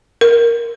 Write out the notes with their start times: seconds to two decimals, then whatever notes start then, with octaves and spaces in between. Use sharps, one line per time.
0.21 A#4